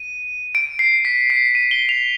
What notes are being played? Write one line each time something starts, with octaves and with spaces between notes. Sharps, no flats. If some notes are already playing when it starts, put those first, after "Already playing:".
Already playing: D#7
D7
C7
B6
C7
D#7
G7
F7